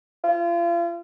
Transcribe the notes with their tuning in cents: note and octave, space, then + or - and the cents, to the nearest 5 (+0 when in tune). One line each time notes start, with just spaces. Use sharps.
F4 -35